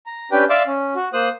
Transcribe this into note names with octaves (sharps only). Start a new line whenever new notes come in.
A#5
C#4 D4 G4 B4 G5
D5 E5 F5 C6 D6 E6
C#4
F#4
A#3 C5 D#6 F#6